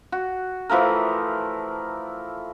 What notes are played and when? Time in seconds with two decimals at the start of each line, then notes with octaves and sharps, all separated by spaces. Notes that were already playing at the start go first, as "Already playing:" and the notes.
0.12 F#4
0.70 E3 F3 A3 A#4